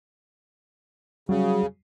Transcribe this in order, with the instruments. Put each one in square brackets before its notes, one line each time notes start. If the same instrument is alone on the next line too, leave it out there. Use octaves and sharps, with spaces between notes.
[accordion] C#3 [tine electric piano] F#3 G3 F#4